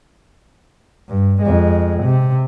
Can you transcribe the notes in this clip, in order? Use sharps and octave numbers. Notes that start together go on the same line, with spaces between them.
G2
F2 G#3
C3